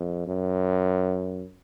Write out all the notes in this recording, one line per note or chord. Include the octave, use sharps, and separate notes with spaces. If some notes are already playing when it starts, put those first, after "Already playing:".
Already playing: F2
F#2